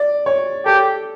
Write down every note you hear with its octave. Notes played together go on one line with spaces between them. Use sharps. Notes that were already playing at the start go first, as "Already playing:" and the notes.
Already playing: D5
C#5
G4 A4